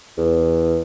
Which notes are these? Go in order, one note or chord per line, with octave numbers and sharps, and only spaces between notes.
E2